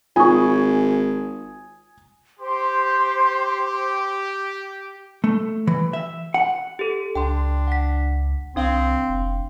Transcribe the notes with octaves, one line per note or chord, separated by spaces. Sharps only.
G#1 F4 G#5 C#6 D#6
G4 C5 C6
A3
E3
E5
F#5
G4 A4
C#2 D4 G5 C6
F#5 B6
C2 C4 D4 F5 C6
F1